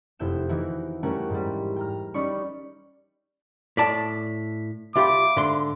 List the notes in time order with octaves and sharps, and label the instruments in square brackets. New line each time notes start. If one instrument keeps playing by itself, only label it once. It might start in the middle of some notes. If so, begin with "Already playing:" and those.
[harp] F1 E4 G6 E7
E3 D#4 E4 F#4
G3 A3 C#4 G4 A#4 F#5
G#2 G3
G5 A#5 F6
G3 C#4 D#4 D5 B5 C#6
[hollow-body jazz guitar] A2 D5 A5 [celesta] B6
[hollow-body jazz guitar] C2 F4 G4 [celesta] E5 F5 B5 [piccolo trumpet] D6
[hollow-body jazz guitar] G#2 D3 C6